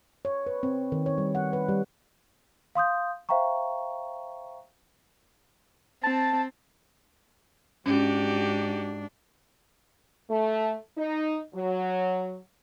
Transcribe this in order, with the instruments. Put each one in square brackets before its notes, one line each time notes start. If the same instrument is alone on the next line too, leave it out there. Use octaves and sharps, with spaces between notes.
[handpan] C#5
B4
C4
D#3
C#5
G3
F#5
B4
G3
[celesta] F5 C6 D#6 G6
C5 E5 F5 G5 A#5 C#6
[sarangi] C4 [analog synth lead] A5
[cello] G#2 D4 [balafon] C#4 [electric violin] F#4 G4
[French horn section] A3
D#4
F#3